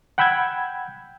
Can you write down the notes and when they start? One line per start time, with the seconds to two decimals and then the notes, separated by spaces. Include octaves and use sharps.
0.18 F#5 G5 B5 E6 G6 G#6